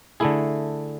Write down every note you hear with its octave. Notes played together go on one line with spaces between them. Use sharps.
D3 A3 E4 G#4